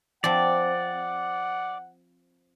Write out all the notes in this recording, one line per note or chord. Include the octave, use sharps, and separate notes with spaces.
F3 C4 D5 F#5